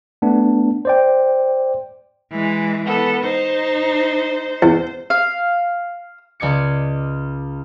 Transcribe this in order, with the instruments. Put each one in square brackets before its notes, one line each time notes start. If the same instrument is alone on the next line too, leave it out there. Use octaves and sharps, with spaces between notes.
[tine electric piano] A3 B3 D4
C5 D5 G5
[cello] E3 G#3
[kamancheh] B3 A4
[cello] D#4 [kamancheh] C5
[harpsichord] E2
[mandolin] F5
[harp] C#2 D5 D6 G#6 C#7